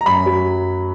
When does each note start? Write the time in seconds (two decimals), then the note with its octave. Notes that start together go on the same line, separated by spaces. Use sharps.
0.01 A#5
0.06 F#2 B5
0.26 F#3